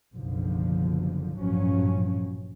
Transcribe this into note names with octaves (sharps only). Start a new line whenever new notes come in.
F#1 B1 D3 F3
A1 G2 A#2 F3 F#3 C#4